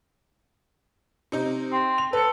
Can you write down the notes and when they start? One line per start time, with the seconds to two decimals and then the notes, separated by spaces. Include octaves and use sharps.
1.32 C3 D#4
1.72 C4
1.98 F7
2.13 A4 B4 C#7